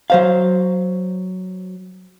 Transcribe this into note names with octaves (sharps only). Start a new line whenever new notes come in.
F#3 C5 F5